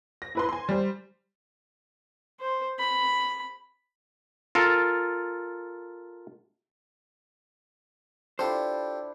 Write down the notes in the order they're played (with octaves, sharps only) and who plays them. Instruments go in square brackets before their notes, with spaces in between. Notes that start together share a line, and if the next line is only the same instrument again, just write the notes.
[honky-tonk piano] A#6
E4 B4 C6
G#5 C6
G3 C5
[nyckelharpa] C5
B5
[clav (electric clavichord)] F4 A4 A#4
[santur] D4 E4 [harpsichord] F4 G4 A4 [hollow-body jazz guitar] C5